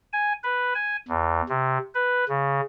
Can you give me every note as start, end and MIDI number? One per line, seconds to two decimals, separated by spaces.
0.13 0.33 80
0.43 0.73 71
0.74 0.96 80
1.08 1.41 40
1.49 1.78 48
1.95 2.25 71
2.29 2.61 49